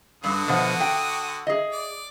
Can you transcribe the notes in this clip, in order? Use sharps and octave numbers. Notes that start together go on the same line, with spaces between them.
G2 D3 F#4 D#6
B2 F3 F#5
G5
G#4 D#5
D5